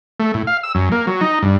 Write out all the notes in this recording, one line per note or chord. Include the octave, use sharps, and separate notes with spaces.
A3
A2
F5
E6
F#2
A#3
F#3
D#4
G2